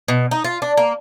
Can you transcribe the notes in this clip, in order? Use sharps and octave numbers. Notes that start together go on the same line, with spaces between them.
B2
D#4
F4
D4
A#3